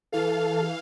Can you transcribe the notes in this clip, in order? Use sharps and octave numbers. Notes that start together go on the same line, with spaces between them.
E3 A4 F5